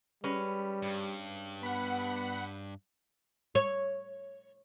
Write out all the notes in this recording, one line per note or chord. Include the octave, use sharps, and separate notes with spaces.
G3 G#3 C#4 B4
G2
B3 F#5 B5
C#5